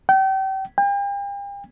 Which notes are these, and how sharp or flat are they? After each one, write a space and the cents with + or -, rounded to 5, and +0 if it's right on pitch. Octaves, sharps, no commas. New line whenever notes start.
G5 -35
G5 +40